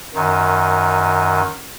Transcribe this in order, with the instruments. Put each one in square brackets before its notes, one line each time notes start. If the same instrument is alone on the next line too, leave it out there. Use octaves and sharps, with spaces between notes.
[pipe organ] F#2 D#3